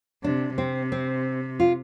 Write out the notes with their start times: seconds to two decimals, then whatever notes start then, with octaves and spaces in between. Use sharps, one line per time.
0.23 C3 D4
0.58 C3 C4
0.92 C4
1.60 F4